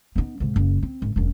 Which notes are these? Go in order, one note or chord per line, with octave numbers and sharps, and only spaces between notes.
B3 D#4
G#2 C3
F#1
C4
G#1
E1 F#2